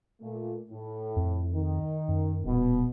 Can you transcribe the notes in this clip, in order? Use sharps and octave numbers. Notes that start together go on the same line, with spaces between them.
A#2 A3
A2
F2
D#3
F#2
D#1 B2